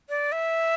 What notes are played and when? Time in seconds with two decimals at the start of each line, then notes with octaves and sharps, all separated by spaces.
0.09 D5
0.32 E5